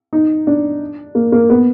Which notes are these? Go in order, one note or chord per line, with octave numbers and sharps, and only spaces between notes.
D#4
D4
A#3
A#3
B3